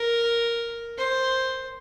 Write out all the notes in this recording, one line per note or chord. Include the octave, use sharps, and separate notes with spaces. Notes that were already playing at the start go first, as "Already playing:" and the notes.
Already playing: A#4
C5